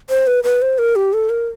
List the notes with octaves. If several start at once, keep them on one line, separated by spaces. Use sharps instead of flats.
C5
B4
B4
C5
A#4
G4
A4
A#4